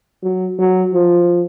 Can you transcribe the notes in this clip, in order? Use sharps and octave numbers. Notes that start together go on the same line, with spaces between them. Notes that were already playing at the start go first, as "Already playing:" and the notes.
F#3
F#3
F3